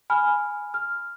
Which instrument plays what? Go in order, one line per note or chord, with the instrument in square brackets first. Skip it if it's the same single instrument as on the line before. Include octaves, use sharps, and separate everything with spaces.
[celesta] G#5 B5 F6
F6